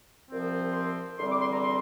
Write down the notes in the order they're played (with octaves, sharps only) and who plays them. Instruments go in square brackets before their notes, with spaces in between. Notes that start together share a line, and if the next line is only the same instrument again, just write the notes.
[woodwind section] C2 A#2 F3 C4
C6
E2 D3 G3 C4 C6
D6
C6
A#5
C6